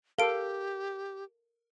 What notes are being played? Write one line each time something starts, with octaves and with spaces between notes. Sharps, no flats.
G4 A4 A#4 F5 D7